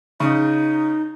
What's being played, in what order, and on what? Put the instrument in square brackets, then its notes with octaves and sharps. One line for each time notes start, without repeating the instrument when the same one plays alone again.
[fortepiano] C#3 [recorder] D#4